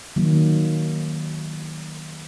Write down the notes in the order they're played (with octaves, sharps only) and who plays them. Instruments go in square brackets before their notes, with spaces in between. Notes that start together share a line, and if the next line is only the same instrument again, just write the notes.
[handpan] D#3 F#3 A#3